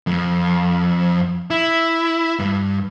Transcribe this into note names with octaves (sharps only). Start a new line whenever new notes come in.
F2
E4
G2